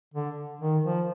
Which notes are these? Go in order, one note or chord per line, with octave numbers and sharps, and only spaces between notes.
D3
D#3
F3